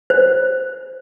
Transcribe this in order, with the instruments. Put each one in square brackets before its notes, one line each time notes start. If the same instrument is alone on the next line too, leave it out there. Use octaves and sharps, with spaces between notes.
[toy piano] C5